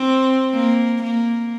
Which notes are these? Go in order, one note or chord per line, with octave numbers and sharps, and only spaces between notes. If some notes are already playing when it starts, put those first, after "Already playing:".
Already playing: C4
A#3
A#3